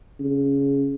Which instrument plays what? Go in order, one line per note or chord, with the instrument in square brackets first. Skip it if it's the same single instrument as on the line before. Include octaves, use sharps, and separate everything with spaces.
[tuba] C#3